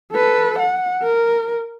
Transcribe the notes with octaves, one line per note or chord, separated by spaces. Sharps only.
A4 B4
F#5
A#4